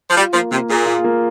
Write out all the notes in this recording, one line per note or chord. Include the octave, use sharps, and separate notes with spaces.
F3
G3 F4
F3 A#3
C3 A#3
A#2 G#4
F4
A#3